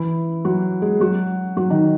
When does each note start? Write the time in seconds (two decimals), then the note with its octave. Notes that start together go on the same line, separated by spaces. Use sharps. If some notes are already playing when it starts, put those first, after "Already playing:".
Already playing: E3 E4
0.45 F#3 F#4
0.82 G#3 G#4
1.00 F#3 F#4
1.57 F#3 F#4
1.70 D#3 D#4